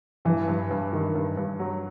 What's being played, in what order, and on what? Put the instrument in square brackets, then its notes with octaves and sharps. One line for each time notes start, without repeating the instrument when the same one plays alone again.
[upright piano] G2 [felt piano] E3
[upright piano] G2
G2
D#3
G2
G2
F#3